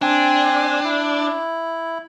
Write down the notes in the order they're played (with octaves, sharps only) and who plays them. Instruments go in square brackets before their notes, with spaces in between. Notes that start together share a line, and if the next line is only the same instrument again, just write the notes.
[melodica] C4 G#5 [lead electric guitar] D4
[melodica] E4